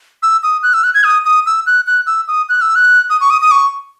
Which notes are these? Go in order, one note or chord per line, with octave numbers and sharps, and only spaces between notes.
E6
D#6
F#6
E6
F#6
G#6
D#6
D#6
E6
F#6
F#6
E6
D#6
F#6
E6
F#6
D#6
C#6
D#6
D#6
C#6